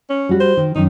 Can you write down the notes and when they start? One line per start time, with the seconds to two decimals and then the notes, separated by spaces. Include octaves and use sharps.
0.10 C#4
0.29 G3 F#4
0.40 C5
0.57 D#3
0.76 F#2 D#3 D#4